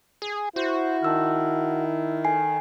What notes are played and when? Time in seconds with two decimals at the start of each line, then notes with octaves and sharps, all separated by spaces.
0.22 G#4
0.56 E4 F#4 C5
1.03 D#3 A5 E6 F6
2.24 A4 G#5 C7